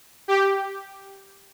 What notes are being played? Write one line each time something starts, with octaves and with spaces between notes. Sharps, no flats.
G4